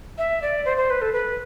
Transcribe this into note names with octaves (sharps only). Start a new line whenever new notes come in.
E5
D5
C5
C5
B4
A4
B4